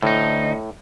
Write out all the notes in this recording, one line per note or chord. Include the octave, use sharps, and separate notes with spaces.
D2 A2 D#4